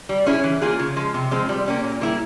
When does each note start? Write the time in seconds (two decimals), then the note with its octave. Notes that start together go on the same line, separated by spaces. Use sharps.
0.09 G3
0.26 C#4 E4 G#4
0.44 E3
0.62 A#3 F4 G#4
0.79 C#3
0.96 F3 G#3
1.14 C3
1.31 F3 G#3 C4
1.49 G3
1.66 A#3 C#4 G4
1.84 A#2
2.01 G3 A#3 E4 G#4